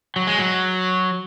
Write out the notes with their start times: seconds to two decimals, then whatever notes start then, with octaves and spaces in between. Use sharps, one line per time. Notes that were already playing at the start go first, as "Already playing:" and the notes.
0.16 F#3
0.27 G#3
0.38 F#3